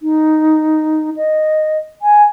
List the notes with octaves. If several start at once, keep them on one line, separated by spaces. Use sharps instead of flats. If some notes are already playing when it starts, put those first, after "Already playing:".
D#4
D#5
G#5